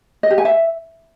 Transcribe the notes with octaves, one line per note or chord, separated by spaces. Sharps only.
D#5
G4
G#5
E5